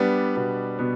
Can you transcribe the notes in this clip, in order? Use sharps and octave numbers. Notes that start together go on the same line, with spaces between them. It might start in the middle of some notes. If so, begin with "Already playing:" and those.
Already playing: G3 B3 D4
B2 B3
B2 B3